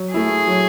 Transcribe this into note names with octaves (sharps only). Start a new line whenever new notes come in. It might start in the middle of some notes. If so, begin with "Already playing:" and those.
Already playing: F#3
A3 E4 G#4
F#3